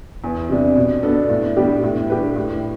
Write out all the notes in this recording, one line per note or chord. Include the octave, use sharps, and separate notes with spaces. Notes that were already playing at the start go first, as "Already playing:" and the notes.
E2
C3 G3 D4
B2
B3 D4 A4
A2
G3 B3 D4 G4
A2
G3 D4 G4 B4
A2